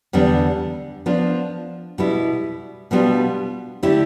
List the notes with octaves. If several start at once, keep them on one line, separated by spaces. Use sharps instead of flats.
E2 D3 G3 B3 D4
F3 B3 D4 F4
B2 G3 B3 E4
B2 G3 B3 D4 F4
D3 A3 E4 G4